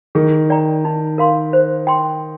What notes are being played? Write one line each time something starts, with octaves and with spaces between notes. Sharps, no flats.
D#3 G#4
D5 G5 A#5
D#4
A#4 F5 C6
C5
G5 C6